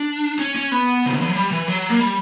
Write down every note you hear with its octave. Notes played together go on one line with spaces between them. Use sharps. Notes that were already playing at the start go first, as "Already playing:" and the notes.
Already playing: D4
C#4
C#4
B3
C#3
D3
E3
F#3
G3
E3
F#3
A#3
G3